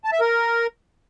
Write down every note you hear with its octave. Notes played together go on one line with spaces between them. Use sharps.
A5
E5
A#4